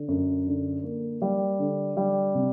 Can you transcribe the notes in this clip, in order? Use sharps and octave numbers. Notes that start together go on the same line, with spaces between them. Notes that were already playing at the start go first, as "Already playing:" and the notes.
Already playing: D3
F#2
D3
A#3
G3
D3
G3
C3